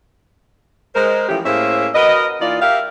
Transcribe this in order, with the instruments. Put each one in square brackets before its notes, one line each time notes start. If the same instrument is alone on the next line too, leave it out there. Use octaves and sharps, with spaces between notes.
[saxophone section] G#3 A#4 C5
E3 F3 A3 C#4 G4
A2 A#3 C#4 G#4 C5 E5
F#4 A#4 B4 D#5
E3 A#3 D#4 F4 D5
G4 A#4 E5 F5